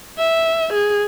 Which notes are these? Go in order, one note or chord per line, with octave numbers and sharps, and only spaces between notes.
E5
G#4